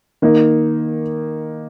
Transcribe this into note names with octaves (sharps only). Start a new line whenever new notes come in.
D#3 A#3 D#4